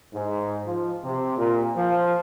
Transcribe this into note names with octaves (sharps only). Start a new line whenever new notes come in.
G#2
F3
C3
A#2
F3